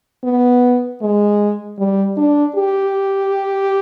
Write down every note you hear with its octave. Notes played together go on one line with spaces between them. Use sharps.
B3
G#3
G3
D4
G4